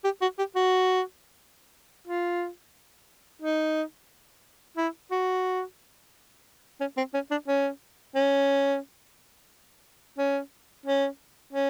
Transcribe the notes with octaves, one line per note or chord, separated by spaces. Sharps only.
G4
F#4
G4
F#4
F4
D#4
E4
F#4
C#4
C4
C#4
D4
C#4
C#4
C#4
C#4
C#4